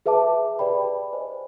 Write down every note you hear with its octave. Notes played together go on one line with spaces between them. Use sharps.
G#4 B4 E5 A5 D6
G4 B4 D5 G5 B5
C5 D#5 G#5